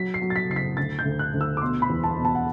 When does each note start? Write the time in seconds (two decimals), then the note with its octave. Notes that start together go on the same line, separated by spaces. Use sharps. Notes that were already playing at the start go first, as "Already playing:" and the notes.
Already playing: F#3 B6
0.14 C7
0.22 F#3
0.30 A6
0.36 B6
0.49 F#1 C7
0.56 B6
0.77 D2 A6
0.99 G6
1.05 D2
1.19 F#6
1.34 D2
1.41 E6
1.57 D6
1.61 B2 C6
1.82 B5
1.90 E2
2.03 A5
2.17 B2
2.25 A5
2.35 F#5